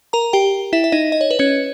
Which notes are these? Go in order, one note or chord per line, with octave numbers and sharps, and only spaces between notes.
A#4 A#5
G4 G5
E4 E5
E5
D#4 D#5
D#5
C#5
B4
C#4 C#5